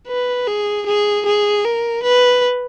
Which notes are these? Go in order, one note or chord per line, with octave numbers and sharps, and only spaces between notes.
B4
G#4
G#4
G#4
A#4
B4